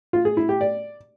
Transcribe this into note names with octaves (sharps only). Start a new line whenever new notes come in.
F4
G#4
E4
G4
D5